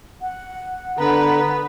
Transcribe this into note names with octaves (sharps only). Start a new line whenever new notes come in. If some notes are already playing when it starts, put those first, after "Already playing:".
F#5
D3 B3 B4 A#5